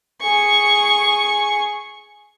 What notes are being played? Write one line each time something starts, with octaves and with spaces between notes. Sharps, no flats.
G#4 C#6